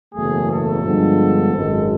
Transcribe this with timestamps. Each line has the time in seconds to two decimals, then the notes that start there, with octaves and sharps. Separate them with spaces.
0.14 F#1 E2 B2 F#3 A3 G#4
0.50 A4
0.84 G2 D3 F3 G#3 B3
1.53 G#1 F#2 D#3 G#3